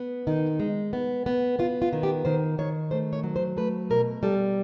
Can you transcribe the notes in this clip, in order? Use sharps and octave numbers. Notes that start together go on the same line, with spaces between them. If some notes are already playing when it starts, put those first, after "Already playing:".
Already playing: B3
D#3 D#4
G#3
B3
B3
B3 F4
F4
D#3
G4
D#3 C5
D#3 C#5
A3 C5
C#5
F#3
C5
A3 B4
B2 A#4
G3 A4